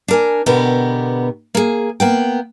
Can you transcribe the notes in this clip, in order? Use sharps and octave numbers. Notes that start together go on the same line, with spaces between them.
D4 A#4 G#5
B2 D3 B3 G4 A#4 B4
A#3 G#4
A#3 B3 G5